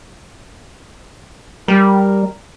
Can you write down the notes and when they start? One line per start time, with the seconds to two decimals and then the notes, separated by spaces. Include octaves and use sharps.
1.68 G3 A#4